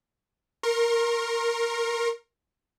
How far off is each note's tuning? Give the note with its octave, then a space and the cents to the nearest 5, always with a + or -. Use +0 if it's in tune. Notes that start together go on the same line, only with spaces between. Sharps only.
A#4 +0 C6 +45